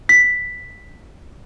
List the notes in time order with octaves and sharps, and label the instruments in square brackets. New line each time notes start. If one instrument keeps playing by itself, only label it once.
[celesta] B6